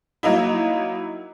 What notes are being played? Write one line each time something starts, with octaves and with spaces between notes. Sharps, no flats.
F#3 A#3 D#4 E4